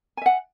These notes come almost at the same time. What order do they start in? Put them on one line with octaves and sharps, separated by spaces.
G#5 E5 F#5